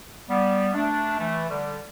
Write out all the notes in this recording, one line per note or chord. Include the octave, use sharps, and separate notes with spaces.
G3 B3
A3 D4
E3 A3
D3 G3